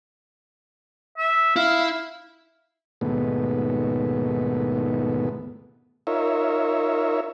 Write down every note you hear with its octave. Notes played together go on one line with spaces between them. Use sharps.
E5
E4 F5
D#2 G#2 B2 A3 B3
D#4 F4 A#4 C#5 E5